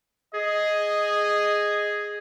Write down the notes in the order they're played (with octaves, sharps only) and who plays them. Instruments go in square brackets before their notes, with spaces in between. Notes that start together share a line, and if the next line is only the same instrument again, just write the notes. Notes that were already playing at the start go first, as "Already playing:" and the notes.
[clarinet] G#4 [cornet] D#5